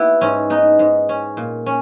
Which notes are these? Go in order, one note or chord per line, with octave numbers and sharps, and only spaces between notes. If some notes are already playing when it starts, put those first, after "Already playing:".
Already playing: B3 E4 G4
G#2 C#4
B3 D#4
G#2
C#4
A#2
C#4